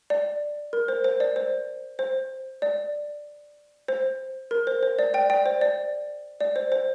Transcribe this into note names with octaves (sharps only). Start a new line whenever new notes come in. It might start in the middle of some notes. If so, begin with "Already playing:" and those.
D5
A#4
C5
C5
D5
C5
C5
D5
C5
A#4
C5
C5
D5
D5 G5
D5 G5
C5
D5
D5
C5
C5